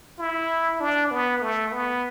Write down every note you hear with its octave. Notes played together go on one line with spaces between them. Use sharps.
E4
D4
B3
A3
B3